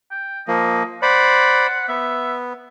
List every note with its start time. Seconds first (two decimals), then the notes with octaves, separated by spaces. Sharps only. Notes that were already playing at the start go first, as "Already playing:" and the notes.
0.11 G5
0.48 F3 A#3 D#5
1.02 C5 D5 F#5 B5
1.89 B3 E5